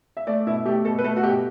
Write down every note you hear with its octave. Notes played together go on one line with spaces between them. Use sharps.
E5
A3 D5
B2 E4
A3 G4
B2 A4
B4
A3 A4
F#4
B2 G4